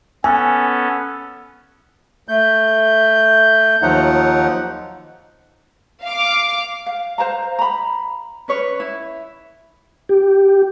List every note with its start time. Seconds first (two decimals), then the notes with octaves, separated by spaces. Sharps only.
0.24 B3 C#4 A4 G#5
2.28 A3 G6
3.82 D#2 F3 F#3 D#4 F#5
6.04 F5 D6
6.86 F5
7.18 C5 F5 A#5
7.59 A#5 B5
8.48 C#4 B4 C#5
8.80 E4
10.09 G4